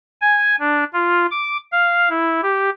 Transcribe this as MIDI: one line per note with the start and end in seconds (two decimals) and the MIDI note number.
0.21 0.56 80
0.60 0.84 62
0.94 1.27 65
1.31 1.57 86
1.72 2.09 77
2.10 2.41 64
2.43 2.70 67